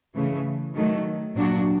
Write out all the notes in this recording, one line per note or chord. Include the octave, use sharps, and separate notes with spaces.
C#3 E3 A3
D#3 F#3 A3
A#2 F#3 A#3 D4 F#4